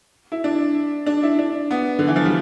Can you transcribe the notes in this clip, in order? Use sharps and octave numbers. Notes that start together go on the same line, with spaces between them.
E4
D4
D4
E4
D4
B3
D3
E3
F3
G3